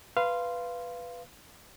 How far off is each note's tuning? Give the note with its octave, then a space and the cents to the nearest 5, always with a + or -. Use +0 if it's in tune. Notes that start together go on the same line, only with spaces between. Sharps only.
B4 +0 F5 -15 C6 +0